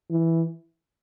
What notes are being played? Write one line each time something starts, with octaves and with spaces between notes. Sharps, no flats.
E3